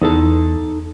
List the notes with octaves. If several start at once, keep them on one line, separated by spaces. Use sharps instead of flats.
E2 D#4 A4 A5